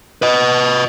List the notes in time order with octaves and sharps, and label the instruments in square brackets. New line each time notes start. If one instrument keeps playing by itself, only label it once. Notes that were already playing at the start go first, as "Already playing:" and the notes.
[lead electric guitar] B4 D#5